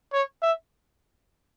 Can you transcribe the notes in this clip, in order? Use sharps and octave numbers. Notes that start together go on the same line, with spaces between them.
C#5
E5